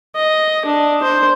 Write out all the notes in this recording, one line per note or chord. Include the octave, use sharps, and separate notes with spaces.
D#5
D4
C5